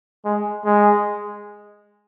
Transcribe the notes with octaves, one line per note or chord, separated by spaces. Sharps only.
G#3
G#3